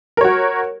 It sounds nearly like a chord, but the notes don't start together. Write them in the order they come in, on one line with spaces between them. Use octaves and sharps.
A#4 C#5 F#4